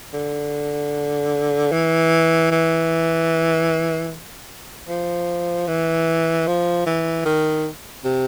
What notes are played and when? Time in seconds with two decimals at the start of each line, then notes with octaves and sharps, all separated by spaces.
0.14 D3
1.72 E3
2.51 E3
4.89 F3
5.67 E3
6.47 F3
6.86 E3
7.25 D#3
8.05 C3